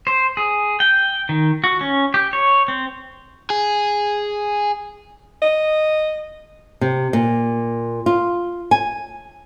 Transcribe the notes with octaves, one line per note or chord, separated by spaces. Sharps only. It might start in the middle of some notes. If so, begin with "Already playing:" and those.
C5
G#4
G5
D#3
F#4
C#4
G4
C#5
C4
G#4
D#5
C3
A#2
F4
G#5